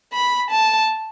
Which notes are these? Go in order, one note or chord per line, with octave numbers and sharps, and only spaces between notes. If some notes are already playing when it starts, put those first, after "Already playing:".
B5
A5